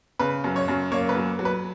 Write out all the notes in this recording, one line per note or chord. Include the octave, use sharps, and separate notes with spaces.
C#3 B4
F#2
C#5
F#2
A#3 C#5
B4
F#3
F#3
B4